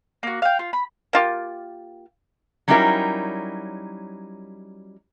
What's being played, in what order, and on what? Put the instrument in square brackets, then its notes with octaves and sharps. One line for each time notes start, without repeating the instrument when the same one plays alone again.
[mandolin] A#3 F#4
F5 G5
F4
B5
[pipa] A#3 F4 G4
[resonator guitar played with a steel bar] F#3 G3 C#4 D#4 E4 A#4